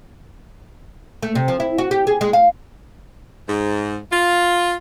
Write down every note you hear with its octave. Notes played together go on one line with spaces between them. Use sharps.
A3
C3
F3
E4
F#4
G4
G#4
G#3
F5
G#2
F4